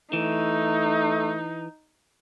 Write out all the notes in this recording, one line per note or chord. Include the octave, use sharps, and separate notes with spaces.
E3 A3 D#4